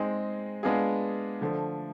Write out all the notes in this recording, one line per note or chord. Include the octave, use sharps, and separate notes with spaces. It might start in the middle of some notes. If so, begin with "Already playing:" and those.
Already playing: G#3 C4 D#4 G#4
G#3 B3 D4 F4 G#4
D3 F3 A3